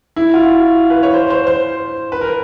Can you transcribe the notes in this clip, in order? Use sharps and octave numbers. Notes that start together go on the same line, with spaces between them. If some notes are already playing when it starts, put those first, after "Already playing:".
E4
F4
F#4
B4
C#5
C5
C5
C5
B4
A#4